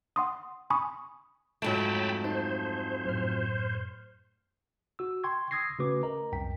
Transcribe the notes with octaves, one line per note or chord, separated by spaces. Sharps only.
F#5 C6 D#6
G#5 B5 C#6 D#6
F2 G#2 F#3 A3 G5 A5 B5
D#4 C5 A5
F#2 A2 F6
F#4 E6
G5 C6 C#6 G#6
D#6 E6 G#6 A#6 C7
C#3 A3 C#4 F#4 B4 D6
A#4 D#5 A#5
C2 F#2 G5 B6